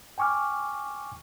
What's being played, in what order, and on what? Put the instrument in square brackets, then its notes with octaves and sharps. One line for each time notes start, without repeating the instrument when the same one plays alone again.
[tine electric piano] G5 G#5 C#6 D6 F6